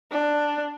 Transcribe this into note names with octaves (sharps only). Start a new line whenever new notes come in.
D4